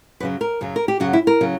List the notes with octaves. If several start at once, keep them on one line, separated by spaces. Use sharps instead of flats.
F#2 C#3 F#3 B4
A#4
F#2 C#3 F#3
A#4
G4
F#2 C#3 F#3 F#4
E4
A#4
C#3 F#3